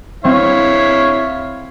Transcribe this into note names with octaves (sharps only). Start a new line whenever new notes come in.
C4 E4 C#5 F5